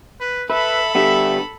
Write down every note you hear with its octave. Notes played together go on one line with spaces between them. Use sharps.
B4
A4 B4 E5 B5
D3 G3 B3 E5